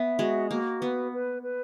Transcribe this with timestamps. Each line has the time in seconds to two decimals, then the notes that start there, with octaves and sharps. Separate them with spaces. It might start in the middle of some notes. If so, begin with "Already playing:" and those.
Already playing: B3 E5
0.19 G#3 F#4
0.51 A#3 F#4
0.81 B3 B4
1.13 B4
1.44 B4